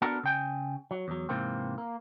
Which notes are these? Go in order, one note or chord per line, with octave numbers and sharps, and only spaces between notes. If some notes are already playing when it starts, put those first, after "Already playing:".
B3 D4 F#4 A4 A#4
C#3 G5 G#5
F#3
E2 F#3
G#2 C3 E3 A#3 C4
A#3